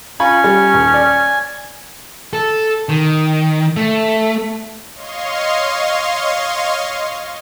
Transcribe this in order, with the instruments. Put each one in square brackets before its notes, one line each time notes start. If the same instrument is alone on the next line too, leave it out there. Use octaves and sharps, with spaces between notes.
[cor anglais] C#4 [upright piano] F4 B5 C#6 [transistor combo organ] G#5
[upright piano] G3
D#1
D5
[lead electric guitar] A4
D#3
A3
[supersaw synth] C#5 D#5 F5 C6 C#6